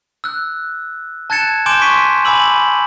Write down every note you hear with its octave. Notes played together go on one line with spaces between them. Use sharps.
E6 F#6
A5 F#6 G#6 A6 C#7 E7
G#5 C6 D6 G6 D7 E7
C6 C#6 B6 D7 D#7
G#5 B5 D6 E6 F#7